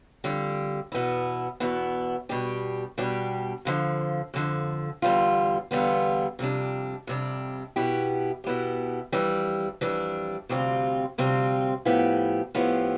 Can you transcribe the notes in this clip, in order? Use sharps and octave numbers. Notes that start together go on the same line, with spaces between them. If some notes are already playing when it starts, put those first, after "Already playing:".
F2 D3 G3
E2 B2 B3 E4
E2 B2 B3 E4
B2 G3 D4 G4
B2 G3 D4 G4
F2 D3 F3
F2 D3 F3
E2 D3 G3 B3 F4
E2 D3 G3 B3 F4
F2 C3 G3 D4
F2 C3 G3 D4
B2 B3 E4 G4
B2 B3 E4 G4
F2 E3 G3 D4
F2 E3 G3 D4
D2 C3 G3 C4 F4
D2 C3 G3 C4 F4
A2 F3 B3 E4 G4
A2 F3 B3 E4 G4